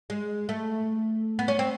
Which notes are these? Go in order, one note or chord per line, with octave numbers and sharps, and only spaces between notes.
G#3
A3
B3
C#4
C4